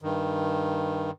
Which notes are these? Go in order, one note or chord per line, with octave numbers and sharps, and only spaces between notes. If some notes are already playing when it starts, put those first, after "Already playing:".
G2 D#3